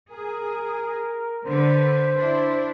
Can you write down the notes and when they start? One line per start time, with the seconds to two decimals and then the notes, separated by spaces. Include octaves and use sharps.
0.12 G#4 A#4
1.46 D3 B4 C5
2.19 D4 E4